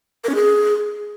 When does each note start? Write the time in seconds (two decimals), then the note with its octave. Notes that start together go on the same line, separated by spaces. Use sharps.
0.24 A#4
0.29 C#4
0.35 G#4